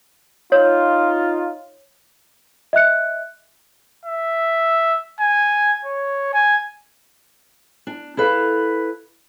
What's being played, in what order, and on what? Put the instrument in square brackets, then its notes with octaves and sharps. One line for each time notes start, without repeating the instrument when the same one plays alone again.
[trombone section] D#4 F4 [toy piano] C#5
[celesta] D#5 E5 F#6 C#7
[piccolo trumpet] E5
G#5
C#5
G#5
[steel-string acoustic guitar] D4
E4 A4 B4 F5